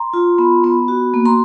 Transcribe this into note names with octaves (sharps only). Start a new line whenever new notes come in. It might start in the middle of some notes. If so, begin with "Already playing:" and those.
Already playing: A#5 C6
F4
B3
B3
F#4
A#3
A#5 C6